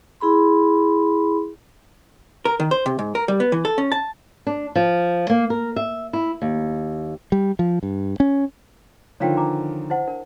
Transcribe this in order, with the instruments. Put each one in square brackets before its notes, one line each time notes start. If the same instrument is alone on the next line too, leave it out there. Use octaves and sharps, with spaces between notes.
[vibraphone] E4 G#4 B5 C6
[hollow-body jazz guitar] A#4
D#3
C5
C3
G#2
A#4
G3
B3
E3
A4
C#4
A5
[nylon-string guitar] D4
F3
A#3
A#4
E5
E4
D#2
[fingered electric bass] G3
F3
G2
C#4
[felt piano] D3 D#3 F3 [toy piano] C#5 F5 G5
[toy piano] G#5 A#5 D6
E4 C5 F#5
D4 A#4